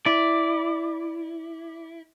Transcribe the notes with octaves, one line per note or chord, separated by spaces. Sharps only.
E4 D5